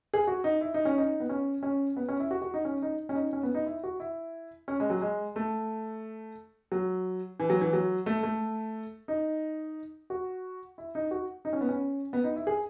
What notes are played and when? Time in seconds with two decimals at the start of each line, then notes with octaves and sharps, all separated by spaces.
0.14 G#4
0.27 F#4
0.44 D#4
0.61 E4
0.74 D#4
0.85 C#4
0.98 D#4
1.20 B3
1.29 C#4
1.63 C#4
1.96 B3
2.08 C#4
2.20 E4
2.31 F#4
2.42 F#4
2.54 D#4
2.65 C#4
2.82 D#4
3.09 C#4
3.15 D#4
3.33 C#4
3.43 B3
3.55 D#4
3.66 E4
3.83 F#4
4.00 E4
4.68 C#4
4.80 G#3
4.90 F#3
5.01 G#3
5.36 A3
6.72 F#3
7.40 E3
7.50 F#3
7.61 E3
7.73 F#3
8.06 A3
8.23 A3
9.08 D#4
10.10 F#4
10.78 E4
10.95 D#4
11.11 F#4
11.45 D#4
11.53 C#4
11.61 B3
11.69 C#4
12.13 B3
12.24 D#4
12.36 E4
12.47 G#4